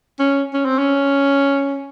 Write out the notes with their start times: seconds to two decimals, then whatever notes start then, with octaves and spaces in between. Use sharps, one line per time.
0.19 C#4
0.53 C#4
0.65 C4
0.78 C#4